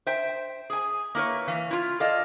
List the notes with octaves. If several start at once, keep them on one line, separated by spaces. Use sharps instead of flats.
C5 E5 G5
G#4 G#5
A#3 E4 B4 C#5
E3 F5
E4 F4
A4 D5 D#5 F5